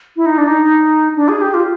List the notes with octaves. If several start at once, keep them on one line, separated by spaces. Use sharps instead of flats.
E4
D#4
D4
D#4
D4
G#4
G4
F4